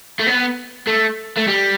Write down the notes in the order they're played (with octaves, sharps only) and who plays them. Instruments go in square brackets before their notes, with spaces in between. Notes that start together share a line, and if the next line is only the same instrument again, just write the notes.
[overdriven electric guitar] A3
B3
A3
A3
G3